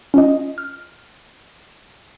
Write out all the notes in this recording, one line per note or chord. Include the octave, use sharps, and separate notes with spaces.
C#4 F4 D#5
F6